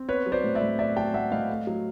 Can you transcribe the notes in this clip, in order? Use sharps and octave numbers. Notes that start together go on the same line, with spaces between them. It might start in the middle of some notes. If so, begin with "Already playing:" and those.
Already playing: C4
B3 B4 C#5
F#3
C5 D5
A2
D5 E5
A2
B3 D5 E5
F#3 G5 A5
A2 E5 F#5
A2 D#5 F5
A3
F#3